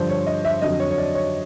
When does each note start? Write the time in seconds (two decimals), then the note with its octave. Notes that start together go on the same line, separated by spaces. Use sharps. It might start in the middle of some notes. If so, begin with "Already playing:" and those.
Already playing: G2 D3 F3 C5
0.09 C#5
0.26 D#5
0.45 E5
0.62 F2 D3 F#3 D#5
0.80 C#5
0.91 C#5
0.98 D5
1.15 C#5